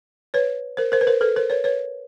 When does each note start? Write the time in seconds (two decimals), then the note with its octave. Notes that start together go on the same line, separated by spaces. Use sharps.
0.34 B4 C#5
0.77 A#4 C5
0.92 A#4 C5
1.01 B4
1.07 A#4 C5
1.21 A4 B4
1.36 A#4 C5
1.50 B4 C#5
1.64 B4 C#5